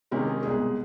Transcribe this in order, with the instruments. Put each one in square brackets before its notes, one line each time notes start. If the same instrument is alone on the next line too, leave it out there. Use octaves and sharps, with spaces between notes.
[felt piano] C3 D#3 G#3 C#4 G4
G#4
C2 B2 G#3 G#4